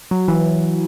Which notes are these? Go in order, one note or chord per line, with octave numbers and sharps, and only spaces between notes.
F#3
E3